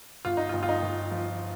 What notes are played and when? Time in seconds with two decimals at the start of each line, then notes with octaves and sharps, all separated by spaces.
0.25 G1 F4
0.37 D#4
0.49 F4
0.53 G1
0.63 F4
0.69 D#4
0.82 G1
1.11 F3